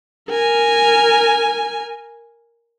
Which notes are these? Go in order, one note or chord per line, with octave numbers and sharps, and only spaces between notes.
A#4 G#5